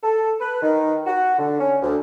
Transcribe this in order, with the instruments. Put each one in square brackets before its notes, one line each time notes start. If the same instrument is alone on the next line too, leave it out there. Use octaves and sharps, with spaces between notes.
[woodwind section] A4
B4
D#3
F#4
D3
C#4
D2